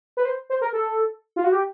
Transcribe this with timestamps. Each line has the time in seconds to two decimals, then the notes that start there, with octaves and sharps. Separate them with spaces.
0.17 B4
0.25 C5
0.50 C5
0.61 A#4
0.73 A4
1.36 F4
1.44 F#4
1.52 G4